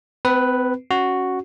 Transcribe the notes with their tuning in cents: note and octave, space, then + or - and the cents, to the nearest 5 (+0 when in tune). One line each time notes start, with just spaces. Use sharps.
C4 -40 B4 +0
C#4 +0 F#4 +0